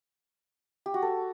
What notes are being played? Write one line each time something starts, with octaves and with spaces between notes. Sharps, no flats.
G4
F#4
A4